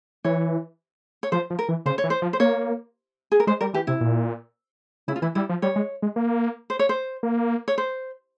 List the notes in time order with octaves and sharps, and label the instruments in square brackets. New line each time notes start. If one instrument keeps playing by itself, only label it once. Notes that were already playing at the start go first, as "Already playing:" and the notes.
[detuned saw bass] E3 [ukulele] C#5
[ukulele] C#5
[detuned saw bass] F3 [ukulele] C5
[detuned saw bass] F3
[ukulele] A#4
[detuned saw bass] E3
[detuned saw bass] C#3 [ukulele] C5
[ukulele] C#5
[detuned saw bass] E3
[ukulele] C5
[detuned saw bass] F3
[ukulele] C5
[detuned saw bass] A#3 [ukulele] C#5
[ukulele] G#4
A#4
[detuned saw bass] G#3 [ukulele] C5
[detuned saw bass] G3 [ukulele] A#4
[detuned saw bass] E3 [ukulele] G4
[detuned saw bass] C3 [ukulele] E4
[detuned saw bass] A#2
[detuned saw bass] C#3 [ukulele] E4
[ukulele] F4
[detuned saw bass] E3 [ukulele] E4
[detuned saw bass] G3 [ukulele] E4
[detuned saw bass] F3
[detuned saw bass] G3 [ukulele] C#5
[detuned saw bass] G#3
G#3
A#3
[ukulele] C5
C#5
C5
[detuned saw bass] A#3
[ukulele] C#5
C5